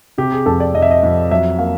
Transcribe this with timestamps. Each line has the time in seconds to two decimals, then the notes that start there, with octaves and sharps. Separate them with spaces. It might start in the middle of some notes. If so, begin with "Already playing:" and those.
0.18 C3 G4
0.32 G#4
0.46 F2 A4
0.60 D5
0.74 F2 D#5
0.82 E5
0.91 D#5
1.03 F2
1.31 F#3 E5
1.59 A#3 F5